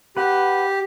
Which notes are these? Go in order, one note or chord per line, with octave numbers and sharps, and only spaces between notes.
G4 B4 F#5